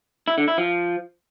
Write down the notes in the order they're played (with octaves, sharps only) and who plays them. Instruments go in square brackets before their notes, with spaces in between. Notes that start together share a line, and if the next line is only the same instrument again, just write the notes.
[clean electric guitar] E4
D3
E4
F3